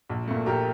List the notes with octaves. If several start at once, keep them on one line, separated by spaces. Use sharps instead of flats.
A#1
A#2 A3
A#1 G4 A#4